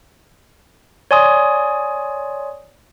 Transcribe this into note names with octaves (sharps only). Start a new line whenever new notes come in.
C#5 D5 G#5 C6 D#6